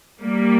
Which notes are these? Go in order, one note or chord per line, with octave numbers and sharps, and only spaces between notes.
G3 A#3